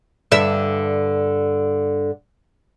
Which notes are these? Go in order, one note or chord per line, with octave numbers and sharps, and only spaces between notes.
G2 D3 E5